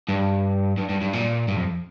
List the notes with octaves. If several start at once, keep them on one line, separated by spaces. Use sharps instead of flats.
G2
G2
G2
G2
A#2
G2
F2